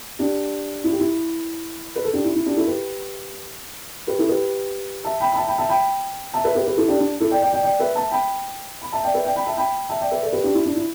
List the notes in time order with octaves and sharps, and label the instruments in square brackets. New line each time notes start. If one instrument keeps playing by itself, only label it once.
[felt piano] D4 G4
E4
G4
E4
B4
A4
D4 G4
E4
E4
D4 G4
E4 A4
G4 B4
G4 B4
E4 A4
G4 B4
E5 A5
G5 B5
B5
E5 A5
G5 B5
E5 A5
G5 B5
E5 A5
B4 E5
G4 B4
G4 B4
E4 A4
D4 G4
D4
E4 A4
D5 G5
D5 G5
D5 G5
D5 G5
B4 E5
E5 A5
G5 B5
B5
E5 A5
D5 G5
B4 E5
D5 G5
G5 B5
E5 A5
G5 B5
E5 A5
D5 G5
B4 E5
A4 D5
G4 B4
D4 G4
E4
D4
E4